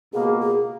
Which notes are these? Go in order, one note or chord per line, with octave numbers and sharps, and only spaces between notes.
C#2 B2 A#3 G#4
G#4